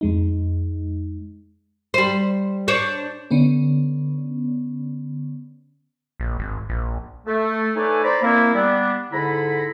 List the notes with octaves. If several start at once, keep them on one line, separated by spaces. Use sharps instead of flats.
F2 G#3 D#4
G3 C5
D4 C5 C#5
D3 B3 C#4
A#1
G#1
A#1
A3
A3 D#4 B4 C#5 D5 G#5
C5 D5 A#5 B5
A#3 C4 E4
G3 B3 D4
G#2 D3 E4 A4 A#5 B5